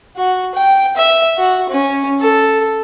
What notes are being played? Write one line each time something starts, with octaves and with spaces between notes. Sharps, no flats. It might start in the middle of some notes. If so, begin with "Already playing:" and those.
F#4
G5
E5
F#4
C#4
A4